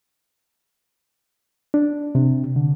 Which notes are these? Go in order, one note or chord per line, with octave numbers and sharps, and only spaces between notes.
D4
C3
D3